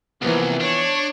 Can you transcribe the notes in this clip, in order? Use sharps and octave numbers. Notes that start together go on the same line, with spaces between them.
C2 E3 F3 A#3 B3
D4 C#5